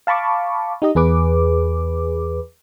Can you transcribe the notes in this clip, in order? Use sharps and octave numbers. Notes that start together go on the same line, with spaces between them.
F5 A5 B5 C#6 D6
D#4 G4 D#5
E2 G#4 B4 D6